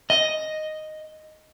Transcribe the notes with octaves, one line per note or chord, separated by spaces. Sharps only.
D#5